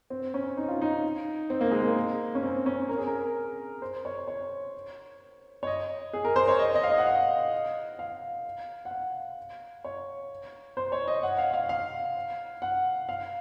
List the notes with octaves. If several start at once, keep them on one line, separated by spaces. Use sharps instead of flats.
C4
C#4
D#4
F4
D#4
C4
A#3
G#3
A#3
C#4
C4
C#4
A#4
G#4
A#4
C5
C#5
C#5
C#5
D#5
G#4
A#4
C5
C#5
D#5
D#5
F5
D#5
F#5
F5
F5
F#5
F5
C#5
C5
C#5
D#5
F#5
F5
F5
F5
F#5
F5